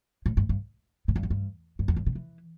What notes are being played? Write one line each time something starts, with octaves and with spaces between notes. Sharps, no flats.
A2
G2
G2
A2
G2
E2
G2
G2
E2
G2
C3
E3